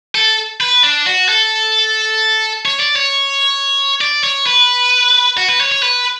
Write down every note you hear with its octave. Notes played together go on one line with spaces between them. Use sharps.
A4
B4
D4
F#4
A4
C#5
D5
C#5
D5
C#5
B4
F#4
B4
C#5
C#5
B4